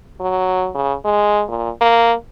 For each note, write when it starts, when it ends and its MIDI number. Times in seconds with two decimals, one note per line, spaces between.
0.20 0.69 54
0.75 0.94 49
1.05 1.43 56
1.48 1.69 46
1.81 2.13 58